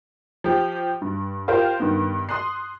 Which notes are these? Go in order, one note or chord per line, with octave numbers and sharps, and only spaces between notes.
F3 G4
G2
F4 G4 A#4 C5 F5 G5
G2 D#3 B3
C6 D#6 F#6 C7